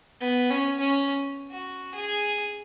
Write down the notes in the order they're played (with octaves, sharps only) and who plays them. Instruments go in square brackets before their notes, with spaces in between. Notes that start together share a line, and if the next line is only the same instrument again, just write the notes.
[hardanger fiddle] B3
C#4
C#4
F#4
G#4